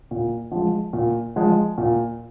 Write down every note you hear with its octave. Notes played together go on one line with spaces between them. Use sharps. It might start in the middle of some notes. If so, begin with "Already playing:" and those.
A#2
F3 G#3
A#2
F3 G#3
A#2